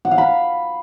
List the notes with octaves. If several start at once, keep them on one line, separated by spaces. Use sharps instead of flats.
F#5
F5
B5